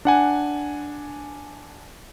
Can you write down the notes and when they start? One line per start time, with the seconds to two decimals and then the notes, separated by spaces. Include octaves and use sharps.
0.05 D4 F#5 G#5